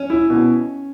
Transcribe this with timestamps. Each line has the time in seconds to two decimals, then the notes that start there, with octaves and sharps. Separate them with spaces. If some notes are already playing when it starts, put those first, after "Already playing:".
Already playing: C#4
0.10 E4
0.30 B2